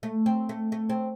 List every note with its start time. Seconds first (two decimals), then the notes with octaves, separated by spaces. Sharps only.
0.03 A3
0.26 C4
0.49 A3
0.72 A3
0.90 C4